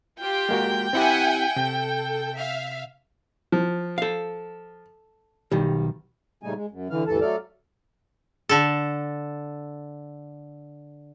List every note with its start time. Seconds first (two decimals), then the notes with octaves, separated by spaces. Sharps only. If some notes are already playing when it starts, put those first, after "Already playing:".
0.20 F4 G4 G5
0.49 G#3 A#3 F#4
0.93 C4 E4 G4 E5 F#5 G#5
1.56 C3 A4 G6
2.36 E5 F5
3.52 F3
3.98 A4 F5
5.52 B1 D#3 G3
6.43 A#2 C#3 G3 A3 D#4 G#5
6.56 G#3
6.71 F#2
6.90 D3 E3 F5
7.07 D2 G2 E3 A4 A5
7.21 F#3 A3 A4 D5 F5
8.49 D3 A4